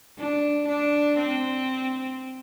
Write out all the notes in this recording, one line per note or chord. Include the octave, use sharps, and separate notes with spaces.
D4
D4
C4